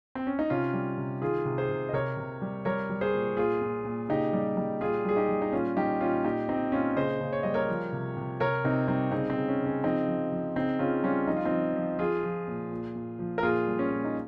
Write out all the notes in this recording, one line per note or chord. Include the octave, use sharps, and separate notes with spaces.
C4
C#4
D#4
C3 C#4 F4
G3
C3
D#3 F4 G#4
C3
G#4 C5
C3
D#5
C3 A#4 C#5
C3
G3
G3 A#4 C#5
G3
G#4 C5
A#2
A#2 F4 G#4
A#2
A#2
C#3 D#4 G4
G3
G3
A#2 F4 G#4
G3 G#4
D#4 G4
G3
D#4
A#2 C#4 F4
G3 D#4 G4
A#2 C#4 F4
A#2 D#4 G4
A#2 C4 D#4
A#2 C#4 F4
C#3 C5 D#5
C#3
C#5
G3 D#5
A#4 C#5
F3
C3
C3
C3 A#4 C#5
C3 C4 D#4
G3 C4 D#4
C#3 C4 D#4
C4
C#3
C#4
C#3
C#4
F3 C4 D#4
F3
F3
C#3 C4 D#4
C#3 C#4 F4
G3 C#4 F4
F3 D#4
F4
C4 D#4
F3
F3
F3 F4 G#4
F3
A#2
A#2
A#2
F3
A#4
A#2 F4 G#4
G3
C#4
A#2
D#4